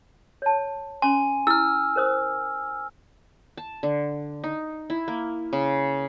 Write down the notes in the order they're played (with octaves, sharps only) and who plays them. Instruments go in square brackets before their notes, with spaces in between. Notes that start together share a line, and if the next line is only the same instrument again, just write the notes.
[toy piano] C#5 A5
[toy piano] C#4 C6 [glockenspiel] G#5
[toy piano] E4 [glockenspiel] E6 F6
[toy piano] A#4 C5 D#6
[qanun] A5
D3
D#4
E4
A#3
C#3